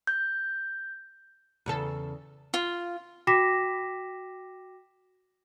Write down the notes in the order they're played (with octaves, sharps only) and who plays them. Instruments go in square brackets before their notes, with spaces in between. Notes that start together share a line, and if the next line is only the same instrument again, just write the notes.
[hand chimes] G6
[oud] E2 C#3 A4
[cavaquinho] F4
[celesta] F#4 G5 D6 A#6 B6 E7